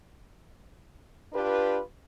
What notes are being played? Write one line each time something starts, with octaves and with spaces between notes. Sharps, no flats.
D4 F4 G4 B4